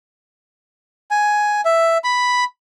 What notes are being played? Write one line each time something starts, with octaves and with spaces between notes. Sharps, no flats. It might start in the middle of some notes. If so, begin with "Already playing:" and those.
G#5
E5
B5